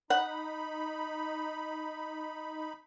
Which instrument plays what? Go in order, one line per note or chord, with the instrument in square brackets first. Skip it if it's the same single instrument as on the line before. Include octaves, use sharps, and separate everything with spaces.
[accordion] D#4 B5 [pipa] F#5